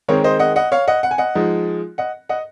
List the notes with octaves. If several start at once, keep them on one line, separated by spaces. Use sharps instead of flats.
D#3 G#3 C4 A#4 C#5
C5 D#5
D#5 F#5
D#5 F#5
C#5 F5
D#5 F#5
F#5
G#5
D#5 F#5
F3 G#3 D#4
D#5 F#5
D#5 F#5